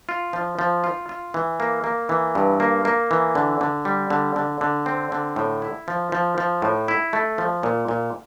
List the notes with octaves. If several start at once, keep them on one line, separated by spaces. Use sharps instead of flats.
F4
F3
F3
F4
F4
E3
A#3
A#3
E3
G2
A#3
A#3
E3
D3
D3
G3
D3
D3
D3
C4
D3
A2
E4
F3
F3
F3
A2
E4
A3
F3
A#2
A#2